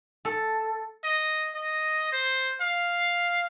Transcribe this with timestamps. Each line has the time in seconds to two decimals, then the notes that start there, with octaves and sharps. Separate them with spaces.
0.25 A4
1.04 D#5
1.55 D#5
2.12 C5
2.61 F5